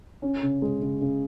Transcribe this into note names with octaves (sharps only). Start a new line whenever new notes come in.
C#4
C#3
G#3
C#3
C#3